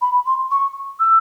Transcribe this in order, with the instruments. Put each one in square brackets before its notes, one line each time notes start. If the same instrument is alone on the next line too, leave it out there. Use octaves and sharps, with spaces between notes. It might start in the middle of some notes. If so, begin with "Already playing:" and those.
[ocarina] B5
C6
C#6
E6